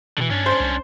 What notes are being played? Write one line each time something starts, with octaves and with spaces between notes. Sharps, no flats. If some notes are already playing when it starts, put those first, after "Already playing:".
B2 D3 E3
G2 C#4 D4
C5
C2